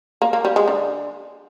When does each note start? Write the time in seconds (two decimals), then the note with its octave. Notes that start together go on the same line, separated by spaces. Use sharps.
0.22 A#3
0.33 A#3
0.45 G3
0.56 G#3
0.68 D3